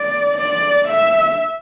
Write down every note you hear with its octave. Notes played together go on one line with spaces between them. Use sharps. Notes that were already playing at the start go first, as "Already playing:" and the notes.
Already playing: D5
D5
E5